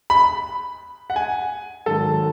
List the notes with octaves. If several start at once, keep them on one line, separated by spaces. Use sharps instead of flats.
B5
F#5
G#5
G#2 D#3 F#3 A4